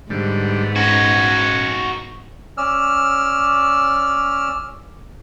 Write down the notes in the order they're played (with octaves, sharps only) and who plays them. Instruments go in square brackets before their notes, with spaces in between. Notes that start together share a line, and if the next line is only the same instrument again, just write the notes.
[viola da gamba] G#2 B3 [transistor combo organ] D3 G3
[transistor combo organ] C#4 G#5 [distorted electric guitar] D#4 F#4
[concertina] C#4 D5 E6 F6